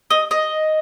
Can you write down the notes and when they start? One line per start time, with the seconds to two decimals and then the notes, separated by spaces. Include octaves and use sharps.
0.10 D#5
0.31 D#5